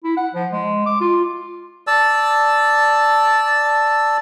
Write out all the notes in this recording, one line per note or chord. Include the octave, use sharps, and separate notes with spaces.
E4
F#5
F3
G#3
D6
F4
D5 A5 E6